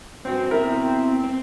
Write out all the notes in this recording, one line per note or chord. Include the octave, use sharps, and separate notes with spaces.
G2 C4 F#4
B2 E4 A#4
C4